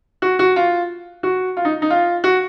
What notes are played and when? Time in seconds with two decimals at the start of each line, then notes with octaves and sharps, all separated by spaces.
0.22 F#4
0.39 F#4
0.56 F4
1.23 F#4
1.57 F4
1.65 D#4
1.82 D#4
1.90 F4
2.24 F#4